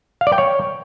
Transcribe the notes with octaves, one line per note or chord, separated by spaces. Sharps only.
F5
D5
G5
C#5